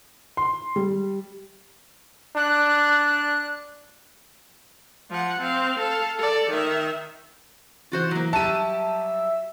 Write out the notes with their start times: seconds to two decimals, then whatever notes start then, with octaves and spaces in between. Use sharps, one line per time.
0.37 C6
0.76 G3
2.36 D4 F#6
5.10 F3 F#5
5.40 C4 F5
5.79 A4 F5
6.18 A4 D5
6.50 D#3 E5
7.92 E3 F4 F#4 C5
8.11 F#3 A#3
8.33 F#3 G3 G4 E5 A5 D#7